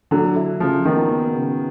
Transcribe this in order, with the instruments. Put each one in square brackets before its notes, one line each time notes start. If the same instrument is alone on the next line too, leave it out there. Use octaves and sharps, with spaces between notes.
[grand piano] D3 [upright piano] F#3
[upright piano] E4
[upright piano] C#3 [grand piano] F3
[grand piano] D#3 [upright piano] B3
[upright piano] B3
C#3